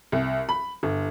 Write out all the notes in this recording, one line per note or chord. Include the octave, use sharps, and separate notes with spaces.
C2
B5
G1